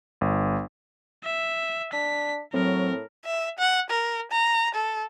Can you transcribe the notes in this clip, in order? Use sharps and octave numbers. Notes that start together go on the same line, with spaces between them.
G1
E5
D4 B6
A2 F#3 C4 A#4
E5
F#5
A#4
A#5
A4